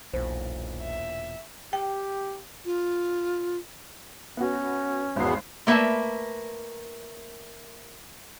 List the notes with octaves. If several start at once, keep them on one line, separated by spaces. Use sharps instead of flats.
E1 B1 A#2 C5
E5
G4 G5
F4
B3 C#4 F#4
G#1 E2 F#3 B3 C7
A3 A#3 B4 E5 A5